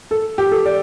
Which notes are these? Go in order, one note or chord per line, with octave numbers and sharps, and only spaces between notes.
A4
G4
A4
D5